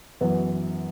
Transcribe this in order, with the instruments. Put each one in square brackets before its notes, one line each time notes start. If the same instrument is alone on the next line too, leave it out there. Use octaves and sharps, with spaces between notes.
[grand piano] F#2 E3 B3 F#4 B4